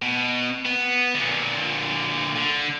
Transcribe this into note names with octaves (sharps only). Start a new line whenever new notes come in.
B2
B3
A#2 D3
D3